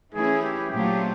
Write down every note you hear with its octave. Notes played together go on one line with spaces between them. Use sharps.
E3 A3 C#4 E4 G#4
G4
A#2 F#3 A3 C4 F4 G4